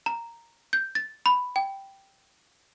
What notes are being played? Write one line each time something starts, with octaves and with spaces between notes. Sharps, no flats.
A#5
G6
A6
B5
G5